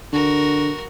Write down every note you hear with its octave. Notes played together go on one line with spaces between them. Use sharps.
D3 F#4 A#4